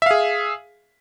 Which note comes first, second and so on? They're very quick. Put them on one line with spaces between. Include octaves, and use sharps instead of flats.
E5 F5 G#4